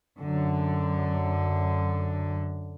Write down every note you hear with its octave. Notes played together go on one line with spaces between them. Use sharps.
F#2 D3